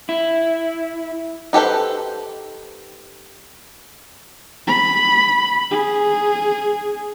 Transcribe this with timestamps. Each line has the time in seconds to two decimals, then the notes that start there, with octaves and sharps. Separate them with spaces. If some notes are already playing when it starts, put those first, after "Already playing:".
0.09 E4
1.53 D#4 G4 A4 B4 C5
4.68 B5
5.71 G#4